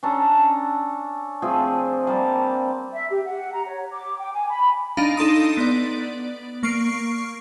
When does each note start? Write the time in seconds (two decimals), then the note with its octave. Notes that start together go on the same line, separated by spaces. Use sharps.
0.03 C#4 D4 A4 A#5
1.42 F3 A3 C4 G#4
2.07 G3 A#3 A5
2.93 E5
3.10 G4
3.26 F#5
3.54 A#5
3.66 C#5
3.93 D6
4.19 G5
4.33 G#5
4.50 B5
4.97 D4 D#4 F5 A#5
5.17 D#4 A4 C6 D#6
5.57 B3 D5
6.63 A#3 C#6 F6 C7 D7